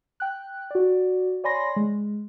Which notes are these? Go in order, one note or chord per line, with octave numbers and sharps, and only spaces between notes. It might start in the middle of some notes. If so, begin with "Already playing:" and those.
G5 F#6
F#4 D5
C#5 D5 G#5 B5 C6 A#6
G#3